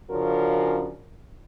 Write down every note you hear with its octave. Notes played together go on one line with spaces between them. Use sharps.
C#3 F3 C#4 D4 F#4 A#4